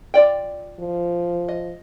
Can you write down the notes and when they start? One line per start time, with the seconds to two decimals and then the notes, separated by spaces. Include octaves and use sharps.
0.14 F4 D5 G5
0.80 F3
1.48 D#5